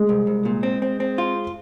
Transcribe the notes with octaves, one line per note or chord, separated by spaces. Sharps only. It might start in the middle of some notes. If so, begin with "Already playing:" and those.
Already playing: G#3
C2
C2
A#2
C4
C4
C4
F4